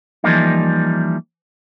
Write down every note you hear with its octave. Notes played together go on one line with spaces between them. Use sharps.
E3 F3 G3 A#3 D#4